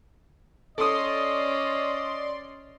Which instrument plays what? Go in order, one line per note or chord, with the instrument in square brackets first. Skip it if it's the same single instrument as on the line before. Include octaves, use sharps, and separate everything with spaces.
[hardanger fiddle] C#4 [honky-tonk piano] A4 D#6 [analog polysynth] D5 C6 [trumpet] D#5